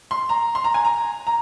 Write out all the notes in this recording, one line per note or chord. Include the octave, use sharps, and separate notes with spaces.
C6
A#5
C6
A#5
G#5
A#5
A#5